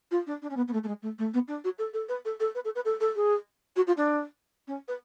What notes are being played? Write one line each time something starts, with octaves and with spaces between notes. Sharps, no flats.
F4
D4
D4
C#4
B3
B3
A3
A3
G#3
A3
A3
B3
D4
F#4
A4
A4
B4
A4
A4
B4
A4
B4
A4
A4
G#4
F#4
F4
D4
C#4
B4